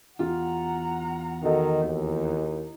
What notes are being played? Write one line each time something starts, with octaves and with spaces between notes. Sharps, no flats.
E2 F4 G4 F#5 A#5
D#3 F#4 A4 D#5
D#2 D#4 E4